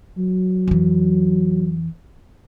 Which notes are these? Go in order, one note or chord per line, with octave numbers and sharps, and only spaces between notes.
F#3
F2 E3